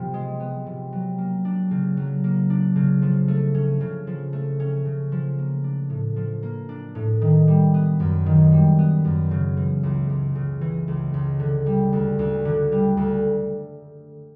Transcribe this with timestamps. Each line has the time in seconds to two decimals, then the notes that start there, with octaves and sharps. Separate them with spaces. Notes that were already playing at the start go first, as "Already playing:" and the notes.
Already playing: C3 F3 B3
0.14 G#3
0.40 B3
0.66 C3
0.92 F#3
1.18 A#3
1.45 D4
1.71 C#3
1.97 F#3
2.24 A#3
2.50 D4
2.76 C#3
3.02 F3
3.28 A3
3.54 C#4
3.81 C#3
4.07 F3
4.33 A3
4.60 C#4
4.85 C#3
5.12 F3
5.38 A#3
5.64 D4
5.90 A2
6.16 F3
6.43 A#3
6.69 D4
6.95 A2
7.21 D#3
7.47 G3
7.74 B3
8.00 F#2
8.26 D#3
8.52 G3
8.78 B3
9.05 F#2
9.31 C#3
9.57 E3
9.83 C#2
10.10 C#2
10.35 C#3
10.61 E3
10.88 C#2
11.14 C#2
11.40 D3
11.66 G3
11.93 D2
12.19 D2
12.45 D3
12.72 G3
12.97 D2